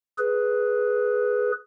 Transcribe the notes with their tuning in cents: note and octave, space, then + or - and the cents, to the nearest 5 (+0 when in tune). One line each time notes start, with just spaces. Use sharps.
G#4 +10 B4 +0